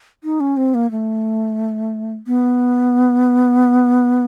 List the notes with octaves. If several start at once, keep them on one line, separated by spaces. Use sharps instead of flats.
D#4
C#4
C4
A#3
A3
B3